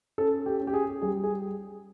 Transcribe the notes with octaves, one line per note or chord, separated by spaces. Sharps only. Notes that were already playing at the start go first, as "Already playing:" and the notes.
C#4 A4
G4
C#4
G4
G#4
G3 G#4
G#4